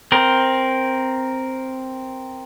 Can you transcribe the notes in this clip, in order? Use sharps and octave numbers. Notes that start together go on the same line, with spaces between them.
C4 A#4